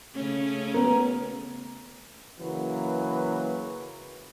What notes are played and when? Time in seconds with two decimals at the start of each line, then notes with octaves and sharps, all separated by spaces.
0.14 C#3 A3 C#4
0.74 B3 A#4
2.40 C#3 E3 F#3 A#3 B4